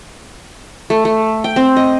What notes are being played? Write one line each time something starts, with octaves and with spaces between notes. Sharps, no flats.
A3
A3
G5
C4
D#5